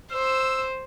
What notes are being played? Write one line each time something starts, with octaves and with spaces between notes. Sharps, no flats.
C5 E6